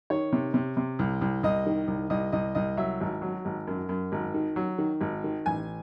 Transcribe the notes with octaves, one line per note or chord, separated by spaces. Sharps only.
D#3 C#5
C3
C3
C3
C2
C2
C2 D#5
D#3
C2
C2 D#5
C2 D#5
C2 D#5
F#3 E5
G#1
F#3
G#1
F#2
F#2
G#1
D#3
F#3
D#3
G#1
D#3
A1 G#5